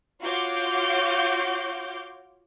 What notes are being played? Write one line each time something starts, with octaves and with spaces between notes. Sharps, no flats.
F4 F#4 C#5 F5 D6 G6